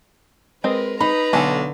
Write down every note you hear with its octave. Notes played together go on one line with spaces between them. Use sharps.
G#3 C4 A#4 B4 D#5
D#4 B4 A#5 B5
B1 D3 A4 G#5 A5